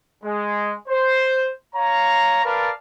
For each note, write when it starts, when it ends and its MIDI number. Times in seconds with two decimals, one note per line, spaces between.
0.24 0.74 56
0.88 1.51 72
1.75 2.40 73
1.75 2.40 77
1.75 2.40 82
2.45 2.70 70
2.45 2.70 71
2.45 2.70 74
2.45 2.70 77
2.45 2.70 81